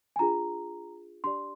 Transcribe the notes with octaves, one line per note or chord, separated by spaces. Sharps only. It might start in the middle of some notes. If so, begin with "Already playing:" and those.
G#5
D4 F4 G#4 A#5
D4 G4 D5 C6